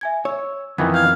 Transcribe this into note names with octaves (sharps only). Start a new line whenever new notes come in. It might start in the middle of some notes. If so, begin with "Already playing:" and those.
E5 G#5 G#6
C#5 E6
F2 D#3 E3 B3 G#6
F5 G6 G#6